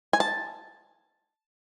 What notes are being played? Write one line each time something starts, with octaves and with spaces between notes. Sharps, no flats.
G#5
A5